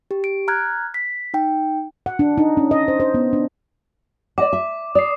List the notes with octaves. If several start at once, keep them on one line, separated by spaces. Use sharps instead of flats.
G4
D7
A#5 F6 F#6 G#6
B6
D#4 G5
F#5
D4
D#4
C#4
D#5
C5
C5
B3
D4
D5 D#5 F#5 D6
E5
D5 D#6 C7